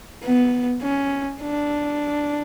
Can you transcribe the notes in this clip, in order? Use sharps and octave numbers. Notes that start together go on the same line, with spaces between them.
B3
C#4
D4